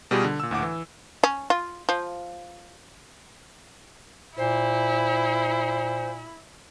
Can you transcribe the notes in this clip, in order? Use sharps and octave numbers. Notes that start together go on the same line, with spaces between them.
B2 G3 F4 G4 G#4 B4
D3
A#2 E6
D2 A2 F#5 D6
E3
C#4
F4
F3
A#2 E4 C5